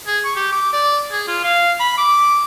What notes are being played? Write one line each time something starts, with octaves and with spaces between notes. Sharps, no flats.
G#4
C#6
G4
D6
D5
G#4
F4
F5
B5
D6